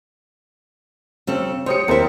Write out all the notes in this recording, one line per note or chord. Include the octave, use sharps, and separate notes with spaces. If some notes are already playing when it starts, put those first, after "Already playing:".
C#3 C4 A4
G4 C5 C#5 D#6 C#7
D#2 C4 E4 A#4 C5